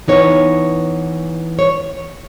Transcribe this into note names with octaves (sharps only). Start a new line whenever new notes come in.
E3 B3 D#4 C#5
C#5